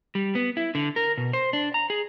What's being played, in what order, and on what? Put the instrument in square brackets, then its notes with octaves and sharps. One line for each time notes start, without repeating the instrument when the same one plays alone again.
[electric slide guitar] G3
B3
E4
D3
A#4
B2
C5
D4
A#5
G#4